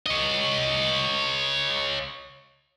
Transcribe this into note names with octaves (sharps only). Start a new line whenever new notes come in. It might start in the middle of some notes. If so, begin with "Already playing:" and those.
C#5 D#5